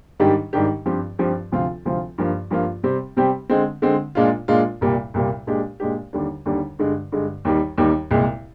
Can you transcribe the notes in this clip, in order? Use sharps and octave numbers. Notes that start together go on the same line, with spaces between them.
G#2 D#3 G3 D4 G4
G#2 D#3 G3 D4 G4
G2 F3 C4 G4
G2 F3 C4 G4
D2 C3 F3 C4 F4
D2 C3 F3 C4 F4
G2 F3 A#3 F4
G2 F3 A#3 F4
C3 G3 C4 G4
C3 G3 C4 G4
D3 G#3 C4
D3 G#3 C4
A#2 G#3 D4 F4
A#2 G#3 D4 F4
C2 A#2 G3 A#3
C2 A#2 G3 A#3
A#2 G#3 D4 G4
A#2 G#3 D4 G4
D#2 D3 G3 D4
D#2 D3 G3 D4
G2 D3 G#3
G2 D3 G#3
D#2 D#3 G3
D#2 D#3 G3
C2 A#2 G#3